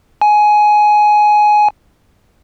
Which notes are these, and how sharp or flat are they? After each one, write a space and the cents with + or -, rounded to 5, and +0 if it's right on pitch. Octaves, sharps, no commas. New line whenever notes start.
G#5 +15